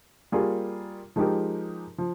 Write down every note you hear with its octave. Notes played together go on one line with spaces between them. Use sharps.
G3 A#3 F4 G#4
F3 G#3 D#4 G4 A#4
F3